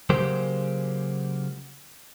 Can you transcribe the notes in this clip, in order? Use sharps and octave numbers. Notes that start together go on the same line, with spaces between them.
C#3 F#3 G#3 A#3 G4 C5